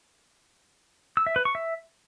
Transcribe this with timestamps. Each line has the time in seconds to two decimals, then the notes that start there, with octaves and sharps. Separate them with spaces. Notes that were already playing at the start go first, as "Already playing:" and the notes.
1.17 E6
1.27 E5
1.36 B4
1.45 C#6
1.55 E5